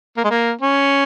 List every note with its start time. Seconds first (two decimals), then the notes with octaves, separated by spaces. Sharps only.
0.17 A#3
0.24 G#3
0.31 A#3
0.61 C#4